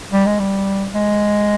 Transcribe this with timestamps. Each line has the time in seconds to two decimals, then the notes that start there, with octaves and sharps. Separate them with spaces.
0.12 G3
0.26 G#3
0.40 G3
0.94 G#3